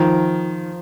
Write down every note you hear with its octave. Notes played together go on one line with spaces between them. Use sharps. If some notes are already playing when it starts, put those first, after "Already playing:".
Already playing: D#3 F3